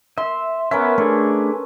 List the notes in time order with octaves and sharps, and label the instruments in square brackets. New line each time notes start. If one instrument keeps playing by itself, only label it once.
[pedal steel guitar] E5 [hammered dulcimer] C6
[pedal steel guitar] B3 E5 [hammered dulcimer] C#4 A#4 B4
[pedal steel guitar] A3 D4 G#4 [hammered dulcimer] A4